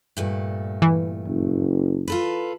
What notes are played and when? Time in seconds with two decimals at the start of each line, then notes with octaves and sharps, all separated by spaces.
0.17 G2 A#2 A3
0.82 E3
1.28 F#1
2.08 F4 A4 B4